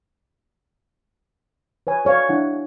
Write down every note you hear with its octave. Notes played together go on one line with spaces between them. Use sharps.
B4 C#5 G#5
A4 C#5 D5 F5
D4 E4 F#5